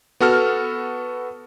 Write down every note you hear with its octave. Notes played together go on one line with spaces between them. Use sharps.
B3 F#4 A4 F6